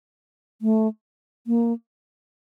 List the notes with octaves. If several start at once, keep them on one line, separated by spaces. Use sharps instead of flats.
A3
A#3